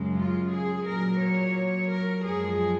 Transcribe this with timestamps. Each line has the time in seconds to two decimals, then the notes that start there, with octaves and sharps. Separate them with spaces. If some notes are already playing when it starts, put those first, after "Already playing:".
Already playing: F#2 C#3 G#3
0.17 F4
0.51 G#4
0.86 A#2 F#3 A#4
1.21 C#5
1.90 A#4
2.25 F#2 F3 G#3 G#4